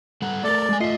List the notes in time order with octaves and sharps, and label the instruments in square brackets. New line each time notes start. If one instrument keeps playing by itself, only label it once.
[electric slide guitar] G3 A4 F#5
[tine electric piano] A3 A6 [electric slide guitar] A4 A#4 [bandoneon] D5
[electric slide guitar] G#3 G#5
[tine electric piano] A3 F4 C7 [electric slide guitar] D#5 E5